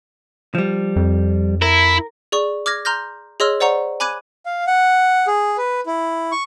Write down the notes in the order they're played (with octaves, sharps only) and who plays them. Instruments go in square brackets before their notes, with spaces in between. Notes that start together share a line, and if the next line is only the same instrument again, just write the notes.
[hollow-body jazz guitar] F3 G3
[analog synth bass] F2
[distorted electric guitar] E4 [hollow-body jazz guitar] A#4
[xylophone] G#4 D5 C#6
D6 F6 G#6 A#6
A#5 C6 F6 G6 A#6
G#4 C#5 D#5 C6 E6 F6
C5 D5 F#5 A#5 C#6
G#5 B5 D6 F#6 G#6 D#7
[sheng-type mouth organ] F5
F#5
G#4
B4
E4
C#6